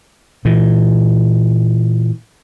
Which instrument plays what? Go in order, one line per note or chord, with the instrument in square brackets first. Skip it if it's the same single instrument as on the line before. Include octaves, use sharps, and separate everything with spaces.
[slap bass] A#2 E3